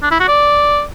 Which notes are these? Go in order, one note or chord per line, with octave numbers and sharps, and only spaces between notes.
D4
E4
F#4
D5